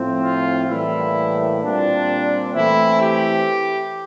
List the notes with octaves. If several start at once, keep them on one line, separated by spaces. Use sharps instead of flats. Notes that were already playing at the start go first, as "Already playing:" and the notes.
Already playing: A2 F3 C4
F4
A2 E3 G3 A#3 E4
A#2 G3 C4 D4
E3 A3 C4 E4
G4